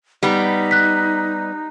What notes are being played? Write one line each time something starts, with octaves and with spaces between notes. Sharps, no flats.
G3 B3 D#4
F#6 B6